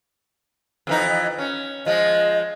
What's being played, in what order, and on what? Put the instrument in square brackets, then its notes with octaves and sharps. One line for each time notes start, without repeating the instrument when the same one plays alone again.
[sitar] F2 E3 D#4
C#4
[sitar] F3 G#3 [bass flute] D#5